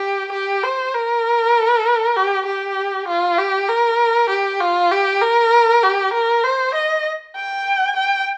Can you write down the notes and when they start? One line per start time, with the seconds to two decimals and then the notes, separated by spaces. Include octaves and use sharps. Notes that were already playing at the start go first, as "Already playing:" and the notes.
Already playing: G4
0.32 G4
0.63 C5
0.94 A#4
2.16 G4
2.46 G4
3.08 F4
3.38 G4
3.69 A#4
4.29 G4
4.61 F4
4.91 G4
5.22 A#4
5.83 G4
6.13 A#4
6.44 C5
6.74 D#5
7.36 G5
7.96 G5